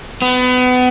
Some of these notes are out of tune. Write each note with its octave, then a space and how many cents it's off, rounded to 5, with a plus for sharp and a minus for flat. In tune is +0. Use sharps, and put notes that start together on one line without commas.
B3 +30